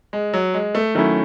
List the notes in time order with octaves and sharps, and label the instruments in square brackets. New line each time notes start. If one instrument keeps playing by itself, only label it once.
[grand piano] G#3
F#3
G#3
A3
[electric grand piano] D#3 F#3 C#4 E4 [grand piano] A3